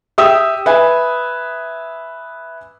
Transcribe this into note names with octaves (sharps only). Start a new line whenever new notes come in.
G4 E5 G5 D#6 E6
B4 E5 G#5